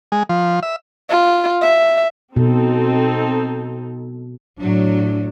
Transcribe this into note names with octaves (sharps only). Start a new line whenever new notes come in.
G#3
F3
E5
F4
E5
B2 C4 D#4 A4
A2 F#3 D4